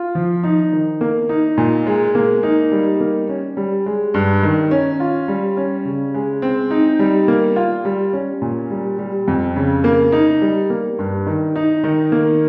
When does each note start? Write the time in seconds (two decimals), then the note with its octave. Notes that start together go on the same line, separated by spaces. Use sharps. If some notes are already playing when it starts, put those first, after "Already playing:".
Already playing: F4
0.15 F3
0.44 D#4
0.72 D#3
1.01 A#3
1.29 D#4
1.58 A#2
1.86 G#3
2.15 A#3
2.43 D#4
2.72 G3
3.00 A#3
3.29 C#4
3.57 G3
3.86 G#3
4.14 G2
4.43 D#3
4.71 C#4
5.00 F4
5.28 G3
5.57 C#4
5.85 C#3
6.14 G#3
6.42 C4
6.71 D#4
6.99 G3
7.28 A#3
7.56 F4
7.85 G3
8.13 C#4
8.42 A#2
8.70 G3
8.99 G3
9.28 F2
9.56 C#3
9.84 A#3
10.12 D#4
10.41 G3
10.70 A#3
10.99 G2
11.27 D#3
11.56 D#4
11.84 D#3
12.12 A#3